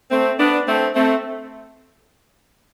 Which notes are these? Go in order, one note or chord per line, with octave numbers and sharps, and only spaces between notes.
A3 C4
B3 D4
A3 C4
A3 C4